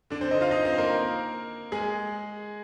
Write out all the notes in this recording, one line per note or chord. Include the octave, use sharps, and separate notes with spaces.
D3 D4
C4 C5
D#4 D#5
F4 F5
D#4 D#5
C4 C5
A#3 A#4
G#3 G#4